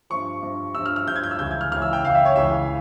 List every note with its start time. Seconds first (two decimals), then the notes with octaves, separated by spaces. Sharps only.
0.10 G2 F3 C#6
0.42 G2 F3
0.75 G2 F3 E6
0.86 F6
0.96 F6
1.07 G2 F3 G6
1.16 G#6
1.24 G6
1.31 E6
1.39 C#2 C#3 E3 G6
1.51 G#6
1.61 F6
1.71 C#2 C#3 E3 F6
1.82 E6
1.93 G5
2.04 C#2 C#3 E3 F5
2.15 E5
2.25 C#5
2.36 C#2 C#3 E3 E5